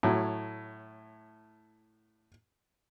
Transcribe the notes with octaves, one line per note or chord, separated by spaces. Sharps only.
A2 F#3